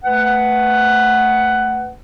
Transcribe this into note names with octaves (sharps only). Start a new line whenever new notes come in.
A3 B4 F#5